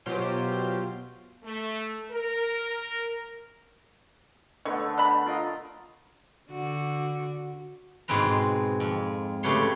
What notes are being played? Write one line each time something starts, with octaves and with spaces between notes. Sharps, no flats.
B2 F#3 F4 G4 C5 G5
A3
A#4
D3 A3 B3 C#5
D4 B5
F4 A#4 D#5
D3 F#4
G#2 B2 G#3 C4 B4 A#5
F2
C#3 A3 G4 B4 C#5 C6